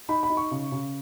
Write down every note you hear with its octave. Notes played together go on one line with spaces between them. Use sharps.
D#4 B5
B5
D#4
C#6
C#3
C#3